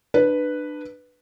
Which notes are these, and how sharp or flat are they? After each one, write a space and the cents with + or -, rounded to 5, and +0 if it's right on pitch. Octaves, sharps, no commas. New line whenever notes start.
D4 +30 B4 +0